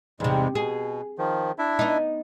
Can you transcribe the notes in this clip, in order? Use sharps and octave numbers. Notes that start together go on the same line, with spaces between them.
E2 G#2 C3 G3 G#3
B2 G#4
D#3 F3
D4 E4 E5
B3 D#4